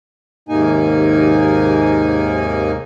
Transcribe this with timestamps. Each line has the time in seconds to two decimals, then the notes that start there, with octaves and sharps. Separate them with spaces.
0.49 D#2 G#2 C3 A#3 D#4 G#5